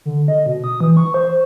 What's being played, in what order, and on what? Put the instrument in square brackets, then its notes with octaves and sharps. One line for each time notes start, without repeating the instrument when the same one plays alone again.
[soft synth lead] D3
D#5
B2
D#6
E3
C#6
C5